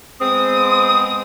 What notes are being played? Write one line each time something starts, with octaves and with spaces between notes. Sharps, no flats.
G#3 B3 C4 D#6